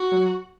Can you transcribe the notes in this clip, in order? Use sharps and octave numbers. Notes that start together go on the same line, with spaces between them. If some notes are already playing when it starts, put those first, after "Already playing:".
Already playing: F#4
F#3